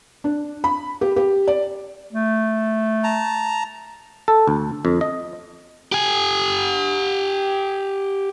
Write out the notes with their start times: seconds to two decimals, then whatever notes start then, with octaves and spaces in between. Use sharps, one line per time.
0.24 D4
0.64 B5
1.01 G4
1.16 G4
1.48 D5
2.13 A3
3.04 A5 A#5
4.28 A4
4.47 D2
4.85 F2
5.01 D#5
5.92 G4 G#5